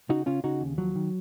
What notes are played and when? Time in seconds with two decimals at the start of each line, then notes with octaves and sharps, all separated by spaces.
0.09 C#3 D#4 F#4
0.26 C#3 C#4 F4
0.44 C#3 D#4 F#4
0.61 D#2
0.78 F3 F#3
0.96 D#3